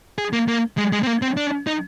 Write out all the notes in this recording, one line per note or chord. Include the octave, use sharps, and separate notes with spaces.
G#4
A#3
A#3
G#3
G#3
C4
A#3
C4
D4
D#4